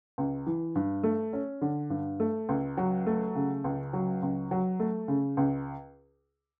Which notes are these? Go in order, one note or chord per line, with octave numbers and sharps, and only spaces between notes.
C#2
E3
G2
A3
C#4
D3
G2
A3
C#2
F#3
A3
C#3
C#2
F#3
C#2
F#3
A3
C#3
C#2